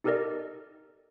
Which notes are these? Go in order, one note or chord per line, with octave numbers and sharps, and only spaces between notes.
D#4 G4 A4 A#4 D5 D#5